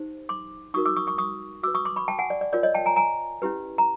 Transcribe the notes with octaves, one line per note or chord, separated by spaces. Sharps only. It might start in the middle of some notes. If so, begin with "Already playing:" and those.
Already playing: D#4 G4 C5
C6 D6
D#4 F#4 A#4 C#6 D#6
D6 E6
C#6 D#6
C#6 D#6
C#6 D#6
F#4 B4 D6 E6
C#6 D#6
C6 D6
B5 C#6
G5 A5
F#5 G#5
D5
D5
F4 A#4 C#5 D5
C#5 D#5
G5 A5
G#5 A#5
G#5 A#5
C#4 E4 G4 B4
A#5